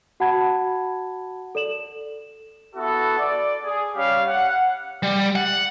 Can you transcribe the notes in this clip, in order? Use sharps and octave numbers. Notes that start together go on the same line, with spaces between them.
F#4 F#5 A5 B5 G#6
A4 D5 E7 F#7
B3 E4 F#4 A4
D5
G#4
G3 C#4 G4 F5
F#5
G3
F#5